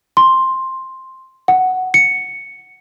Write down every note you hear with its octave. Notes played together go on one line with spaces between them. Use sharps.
C6
F#5
C#7